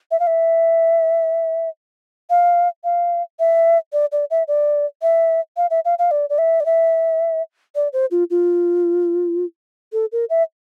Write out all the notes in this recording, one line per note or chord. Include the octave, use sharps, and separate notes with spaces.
E5
F5
E5
F5
F5
E5
D5
D5
E5
D5
E5
F5
E5
F5
F5
D5
D5
E5
D5
E5
D5
C5
F4
F4
A4
A#4
E5